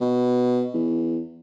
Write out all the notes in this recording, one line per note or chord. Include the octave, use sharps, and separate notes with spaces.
B2
E2